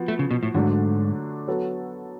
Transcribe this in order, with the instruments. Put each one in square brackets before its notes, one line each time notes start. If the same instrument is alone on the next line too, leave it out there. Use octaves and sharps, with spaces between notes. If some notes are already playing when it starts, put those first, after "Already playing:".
Already playing: [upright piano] F3 B3 F#4
[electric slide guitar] A3
C#3
B2
A2
[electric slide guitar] G#2 [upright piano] D3 F#3 A3 D4
[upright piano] F#3 B3 F#4 A4 C#5